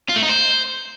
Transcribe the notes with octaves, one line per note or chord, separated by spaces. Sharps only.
F4
A3
D#4
C5